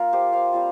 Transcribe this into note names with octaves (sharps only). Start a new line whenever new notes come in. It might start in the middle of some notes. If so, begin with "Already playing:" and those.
Already playing: A#3 F4 A#4
G4 C5
C5 F5
G3 C4 F4